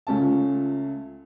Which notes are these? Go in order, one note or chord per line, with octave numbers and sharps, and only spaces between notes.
C#2 A3 C#4 F4 A5